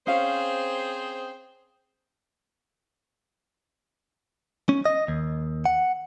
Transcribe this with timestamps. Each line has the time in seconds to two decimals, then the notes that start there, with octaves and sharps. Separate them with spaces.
0.07 C4 C#4 G#4 C5 F5
4.69 C#4
4.85 D#5
5.08 D#2
5.66 F#5